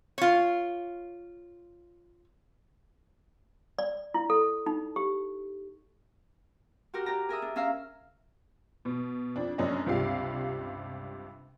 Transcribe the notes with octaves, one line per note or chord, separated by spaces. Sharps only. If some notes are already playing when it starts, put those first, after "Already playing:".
F4 C#5
D5
E4
A4
D#4
G4
F#4 G4 A#4
G4 D5 A#5
G#4 A#4 E5 D#6
D4
C#4 E5 F5 A#5
B2
F2 D4
F1 F#2 C#4 D4 D#5
C#2 G2 C3 G3 F5